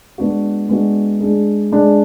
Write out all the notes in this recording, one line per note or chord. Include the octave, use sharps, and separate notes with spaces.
G#3 B3 D4 F#4
G#3 B3 D4 F#4
G#3 D4 G#4
G#3 D4 G#4